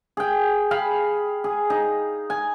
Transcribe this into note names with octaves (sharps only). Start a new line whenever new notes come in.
G#4 G5
G#4 F5 B5
G#4
D#4
G#5